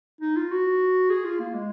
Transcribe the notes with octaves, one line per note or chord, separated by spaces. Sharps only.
D#4
F4
F#4
G#4
F4
A#3
G#3